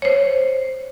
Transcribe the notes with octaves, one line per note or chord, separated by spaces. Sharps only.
C5 C#5